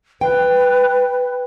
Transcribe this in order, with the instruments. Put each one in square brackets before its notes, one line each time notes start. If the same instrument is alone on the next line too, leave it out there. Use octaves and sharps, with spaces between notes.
[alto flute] B4 [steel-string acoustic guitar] G5